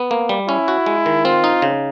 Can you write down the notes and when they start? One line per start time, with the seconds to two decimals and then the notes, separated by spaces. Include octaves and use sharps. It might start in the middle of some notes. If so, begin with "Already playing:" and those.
Already playing: B3
0.11 A#3
0.29 G3
0.48 C#4 E4
0.68 F#4
0.86 G#3
1.06 D#3
1.25 C4 F4
1.44 D#4
1.62 C#3